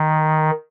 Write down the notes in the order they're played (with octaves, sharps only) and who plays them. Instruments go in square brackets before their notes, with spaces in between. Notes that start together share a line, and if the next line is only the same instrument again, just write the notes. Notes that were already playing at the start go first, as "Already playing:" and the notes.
Already playing: [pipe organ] D#3